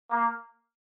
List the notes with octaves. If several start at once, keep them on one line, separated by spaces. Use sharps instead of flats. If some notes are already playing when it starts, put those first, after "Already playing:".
A#3